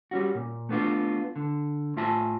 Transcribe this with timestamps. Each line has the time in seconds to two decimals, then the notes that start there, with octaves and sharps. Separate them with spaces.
0.11 G3 C#4 F#4
0.35 A#2
0.69 A3 B3 D4 F4
1.36 D3
1.96 A2 F4 E5 G#5 A5